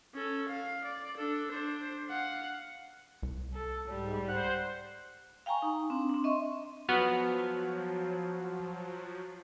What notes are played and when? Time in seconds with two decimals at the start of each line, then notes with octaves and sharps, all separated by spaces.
0.14 C#4 A4
0.49 F5
0.84 D5
1.17 D4 A4
1.51 D4 C5
2.10 F5 F#5
3.23 C2
3.54 A4
3.88 G#2 G3
4.28 C5 F#5
5.46 F5 G5 G#5 A#5 C#6
5.62 D#4
5.90 C4 D4
6.10 C4 D4
6.24 D#5 E5 C6 C#6
6.89 F3 F#3 B3 F#4 F6